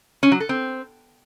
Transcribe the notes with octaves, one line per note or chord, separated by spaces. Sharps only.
C#4
F#3
A4
C4